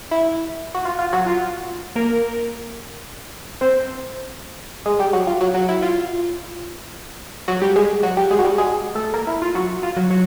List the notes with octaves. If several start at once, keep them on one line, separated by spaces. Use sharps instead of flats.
E4
F#4
F4
F4
F#3 F#4
F4
A#3 A#4
C4 C5
G#3 G#4
G3 G4
F#3 F#4
F4
F#3 F#4
F#3 F#4
E4
F4
F#3 F#4
G3 G4
G#3 G#4
F#3 F#4
G3 G4
G#3 G#4
F#4
G3 G4
G#3 G#4
A3 A4
A#3 A#4
E4
F4
F#3 F#4
F4
F#3 F#4
F#3 F#4